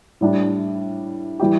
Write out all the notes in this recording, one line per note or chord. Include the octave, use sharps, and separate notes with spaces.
A2 G3 D4
E3 G3 E4 G4